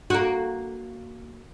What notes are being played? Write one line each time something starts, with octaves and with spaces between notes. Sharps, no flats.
A#3 F#4